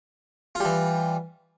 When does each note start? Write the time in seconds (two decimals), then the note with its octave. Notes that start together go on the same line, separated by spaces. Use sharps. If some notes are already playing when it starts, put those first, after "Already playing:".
0.55 F4
0.60 G3
0.65 E3